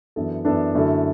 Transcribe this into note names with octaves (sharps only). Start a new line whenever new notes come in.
F#2 E3 B3 D4 A4
F#2 E3 B3 D4 A4
F#2 D3 A3 E4 A4